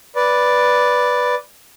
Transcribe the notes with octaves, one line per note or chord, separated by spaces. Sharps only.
B4 D5